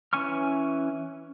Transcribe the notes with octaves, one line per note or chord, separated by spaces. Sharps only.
E3 C#4 G#5 C#6 F6